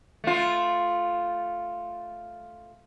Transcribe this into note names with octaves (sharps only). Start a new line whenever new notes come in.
A3 F4